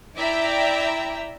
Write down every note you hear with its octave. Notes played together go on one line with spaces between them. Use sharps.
E4 D5 E5 G5 A#5